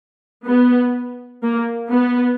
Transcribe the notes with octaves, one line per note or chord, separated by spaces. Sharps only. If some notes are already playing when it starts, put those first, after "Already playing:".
B3
A#3
B3